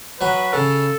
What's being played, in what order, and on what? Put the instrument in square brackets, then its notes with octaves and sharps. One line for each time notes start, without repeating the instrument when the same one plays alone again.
[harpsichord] F#3 [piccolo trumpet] B4
[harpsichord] C#3 [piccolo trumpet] A4